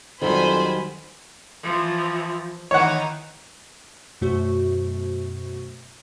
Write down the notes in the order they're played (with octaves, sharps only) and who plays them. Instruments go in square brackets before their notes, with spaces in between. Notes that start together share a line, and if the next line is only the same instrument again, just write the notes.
[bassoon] F2 [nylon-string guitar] D#3 F#3 G3 [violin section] C5 G#5 B5
[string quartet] E3 F3
[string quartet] D#3 E3 D#4 [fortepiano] C#5 F#5
[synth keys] F#2 B2 A3 F#4 C5 C#6